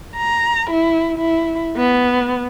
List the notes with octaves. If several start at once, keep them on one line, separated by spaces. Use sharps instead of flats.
A#5
E4
E4
B3